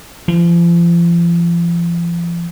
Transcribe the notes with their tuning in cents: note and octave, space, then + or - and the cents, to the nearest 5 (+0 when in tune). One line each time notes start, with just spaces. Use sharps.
F3 -40